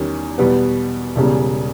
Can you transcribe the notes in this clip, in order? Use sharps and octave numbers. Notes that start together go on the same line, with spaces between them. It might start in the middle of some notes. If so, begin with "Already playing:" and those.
Already playing: E2 D#3 G3 C#4
E2 B2 G3 B3
E1 E2 C#3 G3